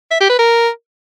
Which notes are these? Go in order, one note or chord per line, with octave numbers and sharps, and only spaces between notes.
E5
G4
B4
A#4